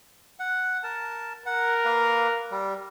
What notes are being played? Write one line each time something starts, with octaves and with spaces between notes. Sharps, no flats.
F#5
A#4 A5
A#4 F#5
A#3 B4 F5
G3